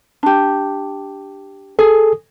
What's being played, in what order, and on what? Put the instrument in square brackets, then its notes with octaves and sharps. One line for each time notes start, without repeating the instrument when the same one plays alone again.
[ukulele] D4 G4
[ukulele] G#4 [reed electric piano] A4